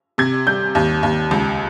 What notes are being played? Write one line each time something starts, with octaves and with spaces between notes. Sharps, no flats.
C3 G#6
G3 G6
D#2
D#2
C#2